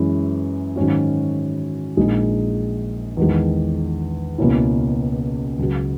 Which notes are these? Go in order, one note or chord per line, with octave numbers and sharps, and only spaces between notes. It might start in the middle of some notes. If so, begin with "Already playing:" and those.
Already playing: F#2 E3 G#3 C#4 E4
G#2 D#3 F#3 C#4 F#4
A#1 A#2 G#3 D#4 G#4
E2 D#3 G#3
C#2 B2 A#3 C#4 E4
C#2 C#3 F#3